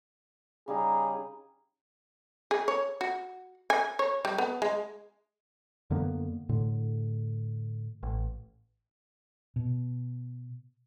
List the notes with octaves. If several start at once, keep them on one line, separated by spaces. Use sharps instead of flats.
C#3 G3 D#4 G#4
G#4
C#5
F#4
G#5
C#5
G3
B3
G#3
F#2 D3 A#3 B3
A2 D3
A1
B2